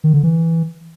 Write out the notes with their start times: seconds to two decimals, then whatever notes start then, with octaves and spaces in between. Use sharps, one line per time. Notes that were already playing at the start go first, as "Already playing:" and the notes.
0.04 D#3
0.14 D3
0.23 E3